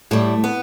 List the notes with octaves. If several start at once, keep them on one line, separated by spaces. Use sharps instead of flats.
A2 G3 A3
B3